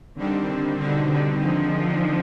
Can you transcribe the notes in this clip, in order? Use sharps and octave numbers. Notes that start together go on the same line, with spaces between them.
D3 D#3 G3 C4
D3
B2 D3 G3 C4 D#4
D3
D3 D#3 F3 G#3 C4 D#4